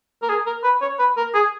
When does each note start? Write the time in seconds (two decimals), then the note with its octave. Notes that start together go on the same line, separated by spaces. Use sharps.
0.22 A#4
0.30 G#4
0.47 A#4
0.63 B4
0.81 C#5
0.99 B4
1.17 A#4
1.34 G#4